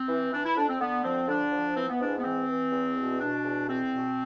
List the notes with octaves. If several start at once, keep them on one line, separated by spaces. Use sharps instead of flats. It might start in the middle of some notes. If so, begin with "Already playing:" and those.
Already playing: C4
E3
E3 D4
E4
F2 D4
C4
D3 B3
F3 C4
D3 D4
F3
E3 C4
B3
G#2 D4
B3
E3 C4
E3
E2
B2
B2 D4
E2
E2 C4
B2